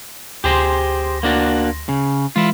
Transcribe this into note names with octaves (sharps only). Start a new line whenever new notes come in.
D2 G4 G#4 C5 C6 A#6
A#3 D4 F#4
C#3
E3 G#3 E4 F4